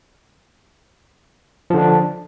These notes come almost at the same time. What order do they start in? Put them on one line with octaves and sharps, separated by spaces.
F3 D3 D4